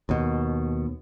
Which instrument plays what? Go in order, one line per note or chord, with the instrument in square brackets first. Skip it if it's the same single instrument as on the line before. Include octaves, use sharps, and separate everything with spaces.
[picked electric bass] D#2 B2